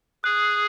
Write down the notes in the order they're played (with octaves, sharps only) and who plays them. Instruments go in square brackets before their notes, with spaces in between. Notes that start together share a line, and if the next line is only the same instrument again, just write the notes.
[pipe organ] G#4 [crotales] F#6